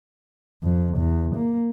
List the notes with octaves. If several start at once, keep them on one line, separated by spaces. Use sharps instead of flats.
F2
E2
A#3